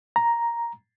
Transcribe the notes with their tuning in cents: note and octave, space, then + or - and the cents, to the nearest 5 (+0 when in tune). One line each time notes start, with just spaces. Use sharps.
A#5 +5